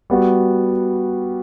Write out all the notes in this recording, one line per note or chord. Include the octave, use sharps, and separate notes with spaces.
G3 B3 F#4